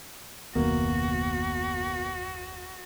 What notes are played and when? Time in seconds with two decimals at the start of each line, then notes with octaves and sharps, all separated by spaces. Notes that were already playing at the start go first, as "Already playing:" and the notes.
0.55 F#1 D#2 B2 A#3 F#4